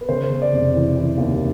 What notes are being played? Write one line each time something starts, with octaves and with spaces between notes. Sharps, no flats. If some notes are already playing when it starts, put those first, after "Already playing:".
B4
C#3 C5
C#3
D5
F1
E3
E3
D#2